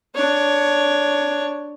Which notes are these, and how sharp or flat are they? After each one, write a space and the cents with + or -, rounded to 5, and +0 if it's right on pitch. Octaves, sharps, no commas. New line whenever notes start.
D4 +0 C#5 +10